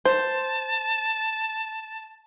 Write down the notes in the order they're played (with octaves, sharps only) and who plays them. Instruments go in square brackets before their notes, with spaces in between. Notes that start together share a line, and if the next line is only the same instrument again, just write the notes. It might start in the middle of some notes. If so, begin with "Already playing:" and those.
[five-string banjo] C5 [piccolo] A5